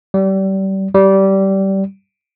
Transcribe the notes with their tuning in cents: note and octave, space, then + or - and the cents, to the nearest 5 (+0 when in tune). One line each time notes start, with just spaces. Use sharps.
G3 -30
G3 -20